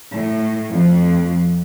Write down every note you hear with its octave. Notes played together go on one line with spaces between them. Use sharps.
A2
F2